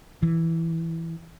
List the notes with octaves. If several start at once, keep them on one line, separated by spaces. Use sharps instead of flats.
E3